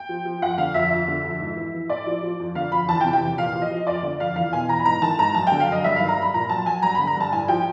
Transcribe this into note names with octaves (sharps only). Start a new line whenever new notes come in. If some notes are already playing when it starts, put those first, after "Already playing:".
Already playing: G5
F3
F3
F2 F#5
D3 F5
F2 E5
F2
D3
F2
G#2
E3
E3
A2 D5
F3
F3
F2
D3 F5
F2 B5
E2 A5
G5
C3
G5
E2
A#2 F5
F3
D#5
F3
F2 D5
D3 D5
F2 F5
E2 F5
B2 G#5
E2 A#5
B5
G#2 A#5
D#3 A5
G#2 A#5
F#2 A5
D3 G5
F5
F#2 D#5
G2 E5
D#3 F5
A#5
G2 B5
A#2 A#5
F#3 A5
F#3 G#5
G2 A#5
D3 B5
A#5
G2 A5
A2 G#5
F3 G5